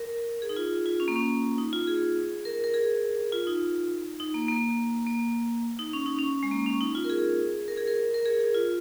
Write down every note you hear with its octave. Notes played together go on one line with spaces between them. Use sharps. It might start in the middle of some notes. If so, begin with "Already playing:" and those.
Already playing: A#4
G#4
D#4
F4
F4
C#4
A#3
C#4
D#4
F4
G#4
A#4
A#4
G#4
F4
D#4
D#4
A#3
A#3
A#3
D#4
C#4
D#4
C#4
G#3
A#3
C#4
D#4
F4
A#4
G#4
A#4
G#4
A#4
A#4
G#4
G#4
F4